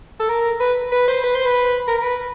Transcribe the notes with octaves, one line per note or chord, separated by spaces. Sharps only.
A4
A#4
B4
B4
C5
B4
C5
B4
A#4
A#4
B4